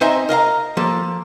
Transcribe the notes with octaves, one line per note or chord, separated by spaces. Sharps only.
C4 D#4 C5 D#5 E5 G#5
A#4 D#5 F5 A#5
F3 A#3 A4